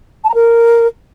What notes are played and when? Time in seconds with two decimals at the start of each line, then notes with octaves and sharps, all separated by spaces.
0.24 A5
0.29 A#5
0.34 A#4